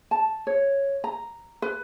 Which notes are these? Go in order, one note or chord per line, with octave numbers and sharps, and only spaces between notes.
A5
C#5
A#5
B4